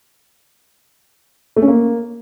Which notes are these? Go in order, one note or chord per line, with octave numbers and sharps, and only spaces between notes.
A3
C#4
A#3